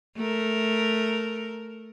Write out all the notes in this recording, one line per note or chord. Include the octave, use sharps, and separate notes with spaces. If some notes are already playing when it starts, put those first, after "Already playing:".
A3 A#4